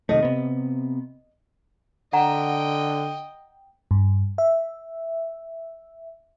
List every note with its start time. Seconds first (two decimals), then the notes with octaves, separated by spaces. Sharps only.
0.09 C3 D#3 A3 D#5
0.22 C3 B3
2.13 D3 D#5 F#5 G5 A#5
3.91 G2
4.38 E5